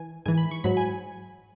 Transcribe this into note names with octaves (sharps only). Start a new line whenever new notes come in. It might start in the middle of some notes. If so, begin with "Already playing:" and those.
Already playing: E3 G#5
G#2 E3 G#5
B5
C#6
G#2 F#3 B5
G#5